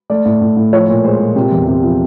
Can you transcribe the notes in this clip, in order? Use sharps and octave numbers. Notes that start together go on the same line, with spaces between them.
A3 D5
A2
A2
A2
F3 C#5
A#2
G#3 C5
A#2
C3
E2
C3
F3